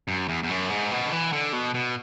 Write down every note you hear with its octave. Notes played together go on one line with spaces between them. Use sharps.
F#2
E2
E2
F#2
G#2
B2
D3
E3
D3
B2
B2